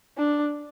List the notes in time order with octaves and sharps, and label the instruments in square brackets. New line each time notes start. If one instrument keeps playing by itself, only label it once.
[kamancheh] D4